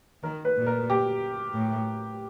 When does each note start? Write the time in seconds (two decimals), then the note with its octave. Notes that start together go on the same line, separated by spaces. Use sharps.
0.23 D#3 A#4
0.45 B4
0.56 A#2
0.67 A#4
0.90 G4
1.55 A2